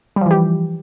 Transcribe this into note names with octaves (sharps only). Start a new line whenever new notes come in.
E3 F3 G3 G4